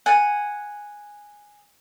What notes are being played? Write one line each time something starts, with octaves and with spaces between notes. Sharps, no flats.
F#5 G#5